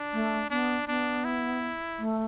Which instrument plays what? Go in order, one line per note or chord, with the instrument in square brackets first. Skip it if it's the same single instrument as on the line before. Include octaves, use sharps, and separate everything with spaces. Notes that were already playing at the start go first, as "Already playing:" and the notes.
Already playing: [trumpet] D4
[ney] A3
[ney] B3 [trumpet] D4
[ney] B3 [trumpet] D4
[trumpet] E4
[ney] A3